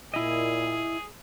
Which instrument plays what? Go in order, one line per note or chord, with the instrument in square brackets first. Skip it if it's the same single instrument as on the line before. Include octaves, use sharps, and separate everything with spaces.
[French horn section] A#2 [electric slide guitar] E4 D#5 [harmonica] G#4